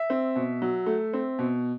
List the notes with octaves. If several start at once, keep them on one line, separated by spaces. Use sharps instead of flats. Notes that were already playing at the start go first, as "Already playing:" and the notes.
Already playing: E5
C4
B2
F#3
A3
C4
B2